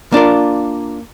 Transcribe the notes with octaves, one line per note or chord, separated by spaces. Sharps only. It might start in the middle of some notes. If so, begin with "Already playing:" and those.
A#3 D4 F4 A#4